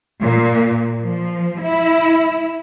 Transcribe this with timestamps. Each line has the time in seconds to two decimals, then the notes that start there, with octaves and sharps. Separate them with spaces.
0.22 A#2
1.01 F3
1.63 E4